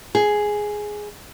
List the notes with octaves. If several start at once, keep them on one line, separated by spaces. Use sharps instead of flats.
G#4